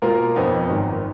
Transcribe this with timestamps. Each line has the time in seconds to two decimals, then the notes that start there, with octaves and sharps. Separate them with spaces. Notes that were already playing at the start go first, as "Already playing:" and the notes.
0.02 B2 A#3 F4 A#4
0.36 F2 F3 B3 D#4
0.68 G#1 F#2 D#3 F#3